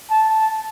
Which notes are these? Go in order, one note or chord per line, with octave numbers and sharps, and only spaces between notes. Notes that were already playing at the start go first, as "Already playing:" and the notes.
A5